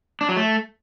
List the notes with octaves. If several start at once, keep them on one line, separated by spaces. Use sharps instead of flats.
D4
F#3
A3